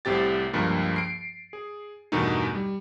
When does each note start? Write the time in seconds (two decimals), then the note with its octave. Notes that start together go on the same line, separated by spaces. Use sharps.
0.05 C2 A2 C3 G4 A6
0.53 C#2 G2 F3 A#3
0.96 C7 D7
1.53 G#4
2.12 E2 G2 B2 D#3 A3 D#4
2.55 G3